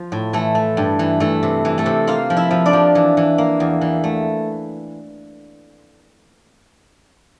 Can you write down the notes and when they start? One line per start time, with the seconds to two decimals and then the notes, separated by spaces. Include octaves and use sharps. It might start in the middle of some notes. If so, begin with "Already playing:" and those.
Already playing: F3 F4
0.12 A2
0.33 E3 A3 A4
0.55 A3
0.77 G2
0.99 E3
1.20 E3 A3 A4
1.43 C3
1.65 E3
1.78 A3 A4
1.86 C3
2.07 A#3 F4 F5
2.30 F3
2.37 E4 E5
2.51 F3
2.65 D4 D5
2.73 F3
2.95 E3
3.17 E3
3.38 A#3
3.60 E2
3.81 E3
4.04 A3